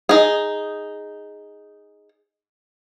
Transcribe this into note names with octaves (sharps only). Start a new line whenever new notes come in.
D#4 G#4